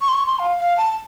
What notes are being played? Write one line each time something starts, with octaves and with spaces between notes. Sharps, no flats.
C#6
C6
C#6
C6
F5
F5
A5